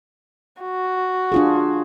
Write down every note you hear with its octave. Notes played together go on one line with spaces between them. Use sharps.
F#4
D4 F4 G#4